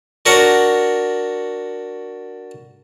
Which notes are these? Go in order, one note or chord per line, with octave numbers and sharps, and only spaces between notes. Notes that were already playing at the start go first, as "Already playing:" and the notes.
D4 F#4 A#4 C#5 F#5